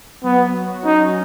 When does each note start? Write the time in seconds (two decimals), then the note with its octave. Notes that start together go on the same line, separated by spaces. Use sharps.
0.24 F#3 B3
0.54 F#4
0.84 C#4 D#4